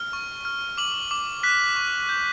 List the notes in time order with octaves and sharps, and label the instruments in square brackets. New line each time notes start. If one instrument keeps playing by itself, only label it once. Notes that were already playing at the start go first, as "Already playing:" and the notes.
Already playing: [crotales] F6
C#6
F6
D6 F#7
D6
F#6 B6
C#6
G6